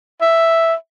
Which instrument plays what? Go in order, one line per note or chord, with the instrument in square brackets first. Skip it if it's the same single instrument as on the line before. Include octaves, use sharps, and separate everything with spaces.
[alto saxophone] E5